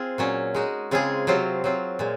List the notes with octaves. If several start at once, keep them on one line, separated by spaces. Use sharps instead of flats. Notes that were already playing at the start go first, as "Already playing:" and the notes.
Already playing: C4 F4 G#4
A#2 F#3 C#4
G#3 D#4 F#4
C#3 G#3 C4 F4 G#4
C3 F#3 C4 F4
F#3 C4 F4
A#2 G#3